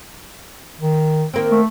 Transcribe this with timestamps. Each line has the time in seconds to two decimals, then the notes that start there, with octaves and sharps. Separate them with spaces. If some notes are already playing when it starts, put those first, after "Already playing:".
0.80 D#3
1.34 D#3 A#3 C4
1.51 A3